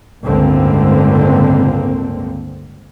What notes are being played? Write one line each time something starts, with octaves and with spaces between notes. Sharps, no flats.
G1 C#2 A2 D3 A#3 C4